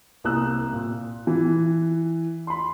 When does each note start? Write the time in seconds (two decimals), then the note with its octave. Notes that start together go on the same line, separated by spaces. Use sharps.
0.24 C2 A#3 D#6 E6 F#6
0.73 A#2
1.27 E3
2.47 B5 C6